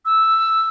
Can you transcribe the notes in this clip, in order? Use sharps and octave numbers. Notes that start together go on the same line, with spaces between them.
E6